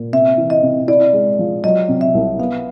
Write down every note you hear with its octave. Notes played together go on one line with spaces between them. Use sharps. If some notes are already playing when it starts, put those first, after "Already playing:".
Already playing: A#2
C3 E5
E3
D#5
C3
E4 D5
G#3
F3
F#3 D#5
C3
E5
C2
B3 F5